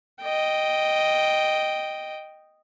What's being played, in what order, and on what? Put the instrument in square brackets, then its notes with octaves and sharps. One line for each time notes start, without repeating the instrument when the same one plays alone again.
[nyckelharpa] D#5 G5